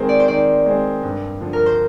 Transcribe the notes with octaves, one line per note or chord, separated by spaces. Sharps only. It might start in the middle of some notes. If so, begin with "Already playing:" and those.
Already playing: D#3 G#3 C4 A#4
D5
C5
D#3 D5
G#3 C4
G2
D3 F3
A#4
C5